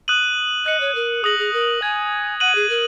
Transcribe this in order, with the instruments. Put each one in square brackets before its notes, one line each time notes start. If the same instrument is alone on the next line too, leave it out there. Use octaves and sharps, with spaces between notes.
[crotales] D#6 F#6 D#7 F#7
[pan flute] D#5 [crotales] F#6 C#7 F#7
[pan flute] C#5
A#4
[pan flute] G#4 [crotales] D#6 A#6 F#7
[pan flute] G#4
A#4
[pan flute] G#5 [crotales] G#6 F#7
[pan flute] F#5 [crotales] F#6 D#7 F#7
[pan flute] G#4
A#4